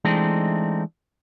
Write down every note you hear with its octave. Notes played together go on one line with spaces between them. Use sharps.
E3 G#3 A3 C4 D4 D#4